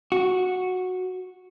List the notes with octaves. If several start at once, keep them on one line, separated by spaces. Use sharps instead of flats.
F#4